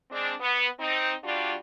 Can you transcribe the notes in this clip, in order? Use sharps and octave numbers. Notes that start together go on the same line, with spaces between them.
G#3 C4 D4
B3
C4 D#4
G3 D4 F4 F#4